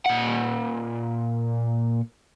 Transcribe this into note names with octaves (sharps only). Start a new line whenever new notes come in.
A#2 F#5